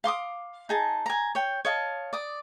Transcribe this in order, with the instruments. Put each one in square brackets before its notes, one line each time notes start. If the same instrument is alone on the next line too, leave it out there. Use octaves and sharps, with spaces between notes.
[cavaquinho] F5 C6 D6 D#6
D#4 G#4 A5
G#5 A#5
C#5 G5
C#5 D#5 F5 A5
D5 D#6